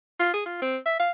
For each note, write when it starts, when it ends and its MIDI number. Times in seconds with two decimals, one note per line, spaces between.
0.19 0.31 65
0.33 0.42 68
0.45 0.60 65
0.62 0.77 60
0.86 0.95 76
0.99 1.11 77